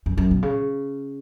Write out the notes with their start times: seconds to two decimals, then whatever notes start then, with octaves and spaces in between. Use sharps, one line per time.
0.06 F#2
0.18 F#2
0.31 B2
0.43 C#3